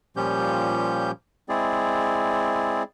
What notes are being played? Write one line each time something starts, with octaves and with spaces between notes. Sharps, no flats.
A#2 F3 G3 C#4 G4 G6
G#3 C4 E4 G#4 D5